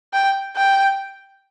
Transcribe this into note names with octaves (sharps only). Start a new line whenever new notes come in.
G5
G5